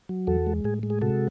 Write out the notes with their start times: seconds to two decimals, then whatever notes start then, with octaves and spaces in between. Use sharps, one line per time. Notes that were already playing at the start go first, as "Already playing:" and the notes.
0.09 F#3
0.27 E2 F#4 A4
0.47 G#3
0.64 A2 G#4
0.83 G#3
0.90 G#4
1.02 C3 F#4 A4